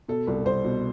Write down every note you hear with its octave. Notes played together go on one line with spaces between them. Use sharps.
B2 A4
C2
C2 C5
B2